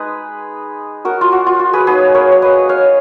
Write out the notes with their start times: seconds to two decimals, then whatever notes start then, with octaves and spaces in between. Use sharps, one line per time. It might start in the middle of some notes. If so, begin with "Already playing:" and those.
Already playing: G#3 D#4 G#4 B4
1.05 F#4 A#4
1.21 F4
1.32 F#4
1.46 F4
1.60 F#4
1.73 G#4 B4
1.87 F#3 A#3 D#4 G#4 B4
2.14 A#4 C#5
2.32 C#5
2.42 B4 D#5
2.69 C#5 F5